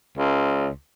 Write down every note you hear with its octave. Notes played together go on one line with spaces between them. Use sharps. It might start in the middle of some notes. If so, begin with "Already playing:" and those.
C#2